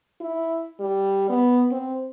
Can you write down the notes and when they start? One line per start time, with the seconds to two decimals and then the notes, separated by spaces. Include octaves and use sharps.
0.21 E4
0.80 G3
1.29 B3
1.71 C4